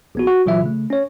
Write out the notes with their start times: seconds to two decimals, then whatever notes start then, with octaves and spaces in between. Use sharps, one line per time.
0.15 A#1 B3 F#4
0.27 F#4
0.46 A#1 A#2 E3 F#3 F4 E5
0.62 C#3 A3
0.90 C#4 C#5